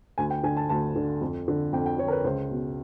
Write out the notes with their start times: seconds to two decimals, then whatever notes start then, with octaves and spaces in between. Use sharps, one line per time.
0.18 D2 G#5
0.31 G5
0.43 D3 G#5
0.57 A5
0.69 D2 A5
0.96 D3
1.21 F2
1.48 D3
1.73 F2 G5
1.86 G5
1.99 D3 C#5
2.08 A#4
2.11 B4
2.24 C#2 C5
2.51 B2